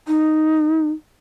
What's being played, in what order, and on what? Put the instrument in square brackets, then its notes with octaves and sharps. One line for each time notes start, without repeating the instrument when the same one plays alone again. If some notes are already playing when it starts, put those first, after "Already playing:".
[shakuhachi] D#4